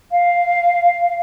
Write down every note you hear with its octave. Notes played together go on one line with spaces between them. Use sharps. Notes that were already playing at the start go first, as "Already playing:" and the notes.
F5